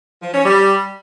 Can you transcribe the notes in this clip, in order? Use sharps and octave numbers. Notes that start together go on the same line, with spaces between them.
F3
C#4
G3